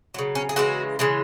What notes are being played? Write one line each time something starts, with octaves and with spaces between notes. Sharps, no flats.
C#3 F#3
C#4
G#4
C#3 E3 G#3 F#4
C#3 E3 G#3